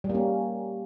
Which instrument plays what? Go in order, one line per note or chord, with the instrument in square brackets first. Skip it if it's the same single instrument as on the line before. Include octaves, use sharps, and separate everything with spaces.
[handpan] G3
A#3
C#4